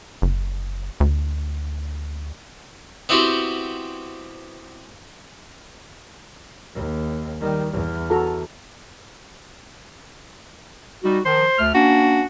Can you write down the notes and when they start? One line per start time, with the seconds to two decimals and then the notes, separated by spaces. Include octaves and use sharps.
0.22 F#1
1.00 D2
3.09 B3 C4 E4 F#4 G4 C5
6.74 D#2
7.40 D#3 G3
7.72 E2
8.10 F#4 A4 A#5
11.04 G3 D#4 F#4
11.25 D#3 F3 C5
11.59 D2 A3 F6
11.74 A#3 C#4 D4 F#4